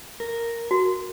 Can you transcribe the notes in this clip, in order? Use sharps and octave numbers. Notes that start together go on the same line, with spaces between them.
A#4
F#4